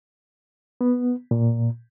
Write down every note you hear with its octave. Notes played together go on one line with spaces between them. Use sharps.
B3
A#2